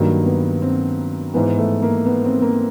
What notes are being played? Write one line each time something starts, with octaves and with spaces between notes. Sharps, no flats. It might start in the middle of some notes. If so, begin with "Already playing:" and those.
Already playing: G2 D#3 F#3 A#3
B3
C4
G#2 E3 B3
A3
A#3
B3
C4
A#3